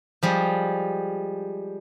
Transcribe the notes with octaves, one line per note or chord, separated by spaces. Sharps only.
F3 G3 G#3